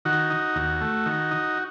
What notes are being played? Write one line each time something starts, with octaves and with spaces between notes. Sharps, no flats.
D#3 F#4
D#4
D#2
A3
D#3
D#4